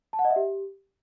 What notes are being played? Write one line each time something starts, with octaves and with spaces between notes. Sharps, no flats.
A5
F#5
D#5
E5
G4